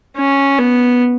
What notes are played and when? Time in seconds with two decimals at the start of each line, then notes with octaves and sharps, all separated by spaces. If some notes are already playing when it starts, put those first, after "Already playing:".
0.17 C#4
0.58 B3